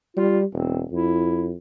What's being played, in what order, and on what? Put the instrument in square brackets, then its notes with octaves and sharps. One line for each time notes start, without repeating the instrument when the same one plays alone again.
[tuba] G3 [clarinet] F4
[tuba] E1 [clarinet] C4
[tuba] F2 [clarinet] E4